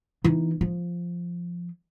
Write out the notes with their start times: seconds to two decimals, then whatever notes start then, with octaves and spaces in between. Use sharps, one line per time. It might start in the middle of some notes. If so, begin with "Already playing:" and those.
0.24 E3 D#4
0.61 F3